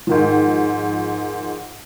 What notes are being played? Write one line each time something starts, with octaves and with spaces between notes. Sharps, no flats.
G#2 D#3 F3